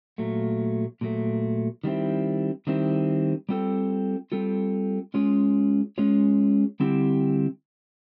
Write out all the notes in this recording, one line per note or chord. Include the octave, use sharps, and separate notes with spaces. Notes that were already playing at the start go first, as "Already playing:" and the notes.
A#2 F#3 A3
A#2 F#3 A3
D#3 G3 C4 E4
D#3 G3 C4 E4
G3 C4 F4 A4
G3 C4 F4 A4
G#3 C#4 F4 G#4 C#5
G#3 C#4 F4 G#4 C#5
D3 G3 C4 E4 G4